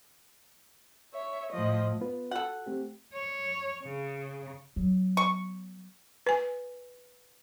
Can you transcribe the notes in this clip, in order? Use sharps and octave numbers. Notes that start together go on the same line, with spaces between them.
C#5 E5
A2 F3 D#5
B3 F4 B4
F#4 A4 F#5
A3 C4 G4
C#5
C#3
F#3 B3
C#6
B4 G#5